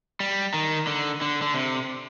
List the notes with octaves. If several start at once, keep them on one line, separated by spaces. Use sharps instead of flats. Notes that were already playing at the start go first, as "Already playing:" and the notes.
G3
D#3
D3
D3
D3
C3